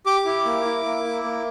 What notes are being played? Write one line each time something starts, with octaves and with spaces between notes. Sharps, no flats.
G4 D6
E4
A#3
E4
A#3
E4
A#3